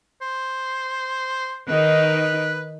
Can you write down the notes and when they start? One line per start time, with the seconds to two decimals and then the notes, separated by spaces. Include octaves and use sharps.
0.22 C5
1.68 D#3 D#4 B4